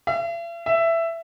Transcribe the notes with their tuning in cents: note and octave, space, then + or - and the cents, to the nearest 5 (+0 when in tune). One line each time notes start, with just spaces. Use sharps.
E5 +45
E5 +10